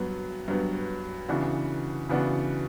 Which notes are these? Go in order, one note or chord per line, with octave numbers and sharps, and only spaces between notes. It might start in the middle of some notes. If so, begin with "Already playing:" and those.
Already playing: G2 F#3 B3
G2 F#3 B3
C#3 E3 B3 D4 F#4
C#3 E3 B3 D4 F#4